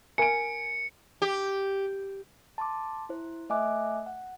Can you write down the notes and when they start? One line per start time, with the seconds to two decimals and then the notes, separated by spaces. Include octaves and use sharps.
0.18 A#4 G#5 A#5 C#7 D7
1.22 G4
2.58 A5 C6 D6
3.09 E4 C5
3.50 A3 D#5 E5 G#5 D6 F#6
4.06 F#5